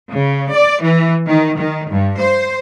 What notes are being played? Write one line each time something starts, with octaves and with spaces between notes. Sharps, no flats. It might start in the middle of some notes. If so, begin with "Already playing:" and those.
C#3
D5
E3
D#3
D#3
G2
C5